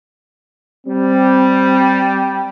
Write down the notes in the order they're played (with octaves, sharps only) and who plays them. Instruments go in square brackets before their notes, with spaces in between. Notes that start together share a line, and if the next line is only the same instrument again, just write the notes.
[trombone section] G3 [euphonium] C4